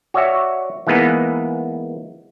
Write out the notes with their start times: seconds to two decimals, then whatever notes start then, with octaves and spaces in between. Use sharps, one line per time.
0.14 F#4 C#5 D5 E5
0.87 E3 G#3 A#3 B3 D#4